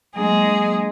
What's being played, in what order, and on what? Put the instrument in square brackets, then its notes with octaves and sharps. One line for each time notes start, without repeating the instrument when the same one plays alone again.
[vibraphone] F#3 A#3 D4 [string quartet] G#3 G#4